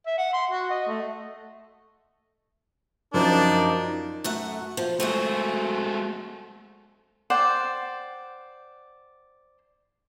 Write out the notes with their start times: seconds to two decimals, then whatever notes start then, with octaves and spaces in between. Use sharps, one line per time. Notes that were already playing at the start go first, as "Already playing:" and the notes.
0.06 E5
0.18 F#5
0.33 C6
0.51 F#4
0.70 D#5
0.87 A3
3.14 F#2 F3 D4 D#4 A#4
4.24 F#2 A3 F#5
4.77 F3
5.00 G#3 A3 C4 F#4 G#4
7.30 C5 D5 F#5 G5